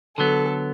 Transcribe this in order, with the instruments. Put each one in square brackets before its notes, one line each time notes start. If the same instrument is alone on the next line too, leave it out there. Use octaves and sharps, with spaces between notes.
[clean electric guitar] D3 F#3 B3 [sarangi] A4